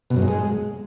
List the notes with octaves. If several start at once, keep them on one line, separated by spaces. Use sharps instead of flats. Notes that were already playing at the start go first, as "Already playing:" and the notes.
B2
F#2
G#2
G#3